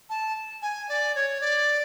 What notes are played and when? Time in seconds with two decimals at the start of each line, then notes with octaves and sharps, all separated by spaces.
0.10 A5
0.62 G#5
0.89 D5
1.15 C#5
1.41 D5